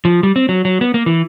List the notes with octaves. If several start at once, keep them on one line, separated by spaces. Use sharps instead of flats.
F3
G3
C4
F#3
F#3
B3
A#3
E3